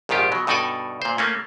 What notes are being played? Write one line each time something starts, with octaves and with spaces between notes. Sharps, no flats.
A#1 G#2 D#3 F4 G4
B2 F#3
G2 B2 D#4 A4 D5 G#5
A#2 C5
A3 A#3 C#4